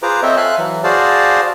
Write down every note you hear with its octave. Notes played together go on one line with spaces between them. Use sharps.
F4 G#4 B4 C5 A#5 D6
C4 A4 C5 C#5 D#5 E5
A4 E5 F5 G#5 F#6
E3 F#3
F#4 G#4 C5 D5 F5 A5